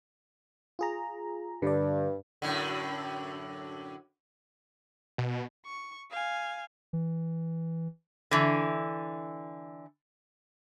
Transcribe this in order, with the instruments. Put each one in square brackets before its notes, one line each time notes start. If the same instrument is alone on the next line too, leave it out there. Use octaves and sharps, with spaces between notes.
[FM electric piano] F4 G#4 A#5
[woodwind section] G2 [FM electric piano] D3 D5
[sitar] F#2 A2 D3
[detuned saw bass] B2
[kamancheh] C#6
F5 G#5
[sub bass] E3
[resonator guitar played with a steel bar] D3 E3